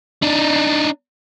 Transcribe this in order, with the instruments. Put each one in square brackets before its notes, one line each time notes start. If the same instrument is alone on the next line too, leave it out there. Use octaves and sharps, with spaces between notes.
[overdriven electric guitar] D4 D#4